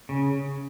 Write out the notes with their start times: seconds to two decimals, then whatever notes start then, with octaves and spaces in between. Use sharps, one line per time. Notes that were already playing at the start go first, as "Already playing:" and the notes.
0.09 C#3